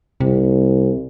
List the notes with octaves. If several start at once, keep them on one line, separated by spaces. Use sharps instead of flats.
C2 C3